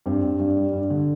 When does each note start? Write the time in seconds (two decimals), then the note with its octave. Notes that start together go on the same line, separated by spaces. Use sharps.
0.06 G2 C4
0.23 G2
0.39 G2
0.57 G3
0.73 G2
0.90 D3